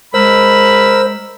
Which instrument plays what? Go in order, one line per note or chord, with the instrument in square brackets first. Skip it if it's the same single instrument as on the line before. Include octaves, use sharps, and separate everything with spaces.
[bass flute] G#3 [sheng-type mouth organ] A#4 E6 [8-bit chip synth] C5 [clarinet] B5